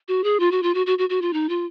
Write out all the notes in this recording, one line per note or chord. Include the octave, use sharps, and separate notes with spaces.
F#4
G#4
F4
F#4
F4
F#4
F#4
F#4
F#4
F4
D#4
F4